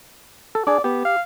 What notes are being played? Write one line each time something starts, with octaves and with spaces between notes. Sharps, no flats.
A4
D4 G#4 D5
B3 G4
F5